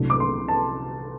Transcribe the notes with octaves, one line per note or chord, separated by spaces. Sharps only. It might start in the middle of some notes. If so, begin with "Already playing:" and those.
Already playing: C2 C3 F#3 A3 D4
D6
C6
A5